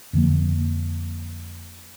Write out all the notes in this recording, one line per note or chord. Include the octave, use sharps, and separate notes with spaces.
F2 D3 F3 A#3